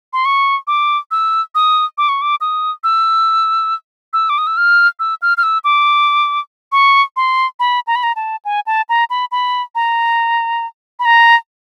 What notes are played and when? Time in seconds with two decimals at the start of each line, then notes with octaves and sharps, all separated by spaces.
0.13 C6
0.25 C#6
0.67 D6
1.11 E6
1.55 D#6
1.98 D6
2.09 C#6
2.22 D6
2.41 D#6
2.84 E6
4.13 E6
4.30 D6
4.38 D#6
4.47 E6
4.57 F6
5.00 E6
5.22 F6
5.37 F6
5.43 E6
5.64 D6
6.72 C#6
7.16 C6
7.60 B5
7.87 A#5
7.96 B5
8.03 A#5
8.16 A5
8.45 G#5
8.67 A5
8.89 A#5
9.10 B5
9.32 B5
9.75 A#5
10.99 B5
11.05 A#5